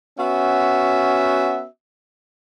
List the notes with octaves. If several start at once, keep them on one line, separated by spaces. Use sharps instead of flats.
B3 C#4 F#4 E5